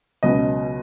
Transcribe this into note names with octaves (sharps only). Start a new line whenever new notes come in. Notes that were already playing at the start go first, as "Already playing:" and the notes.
C#2 B2 F#3 B3 D#5